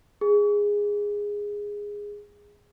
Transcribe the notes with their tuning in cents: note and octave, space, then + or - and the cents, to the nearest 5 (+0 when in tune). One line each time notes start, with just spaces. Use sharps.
G#4 -10